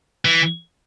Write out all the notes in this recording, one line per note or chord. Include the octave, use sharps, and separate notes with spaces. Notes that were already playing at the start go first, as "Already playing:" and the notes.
E3